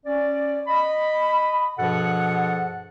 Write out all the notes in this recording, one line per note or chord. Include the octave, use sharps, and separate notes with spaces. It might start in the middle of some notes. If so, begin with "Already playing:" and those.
C#4 D5
D#5 B5
G2 B2 F3 G#4 A4 F#5